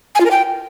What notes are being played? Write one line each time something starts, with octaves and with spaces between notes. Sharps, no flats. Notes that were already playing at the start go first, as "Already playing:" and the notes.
G#5
F4
A#4
G5